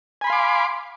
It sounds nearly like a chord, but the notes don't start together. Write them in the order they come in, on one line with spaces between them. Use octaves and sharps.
G#5 B5 C6 F5 D6